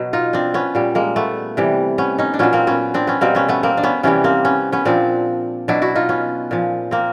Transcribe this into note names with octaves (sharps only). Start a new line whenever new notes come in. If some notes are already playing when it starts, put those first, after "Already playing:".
Already playing: B2 F#3 B3
D#4 F4
C4 D4
B3 C#4
A#2 G3
G#3 A#3
A3 B3
C3 E3 G3
B3 C#4
C#4 D#4
D4
A#2 F#3 B3 C#4
A#3 C4
B3 C#4
C4 D4
B3 C#4
B2 G3 A#3 C4
B3 C#4
A3 B3
A#3 C4
D4
B3 C#4
C3 E3 G3 B3 C#4
A#3 C4
B3 C#4
B3 C#4
A#2 F3 C4 D4
B2 F#3 D4 E4
E4 F#4
D#4 F4
B3 C#4
A#2 F3
A#3 C4